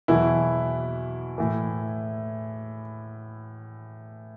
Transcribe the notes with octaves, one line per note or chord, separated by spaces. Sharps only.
E2 B2 E3 F#3 E4
A2 E3